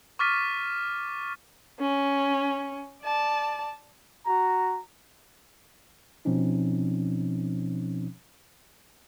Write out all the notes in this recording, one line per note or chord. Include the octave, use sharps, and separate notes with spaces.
C#6 D6 F6 A6 B6 D#7
C#4
D5 A5
F#4 A#5
B2 F3 C4 C#4 D#4